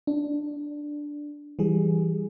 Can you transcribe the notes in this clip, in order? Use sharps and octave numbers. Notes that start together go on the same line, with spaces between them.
D4
E3 G3 G#4